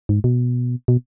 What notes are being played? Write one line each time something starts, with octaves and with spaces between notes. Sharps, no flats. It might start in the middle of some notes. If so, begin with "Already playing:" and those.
G#2
B2
B2